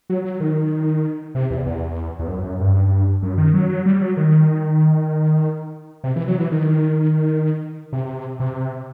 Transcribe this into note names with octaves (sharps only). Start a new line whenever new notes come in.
F#3
F#3
D#3
C3
E2
E2
E2
F#2
F#2
G2
F#2
D#3
F#3
F#3
G3
F#3
D#3
C3
E3
F#3
E3
D#3
C3
C3